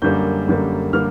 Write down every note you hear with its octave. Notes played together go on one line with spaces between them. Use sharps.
F#2 D3 G3 A#3 G6
F#2 D3 G3 A#3
D3 G3 A#3 F6